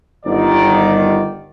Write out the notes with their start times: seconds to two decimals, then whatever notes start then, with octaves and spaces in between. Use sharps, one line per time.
0.25 G1 D#3 D5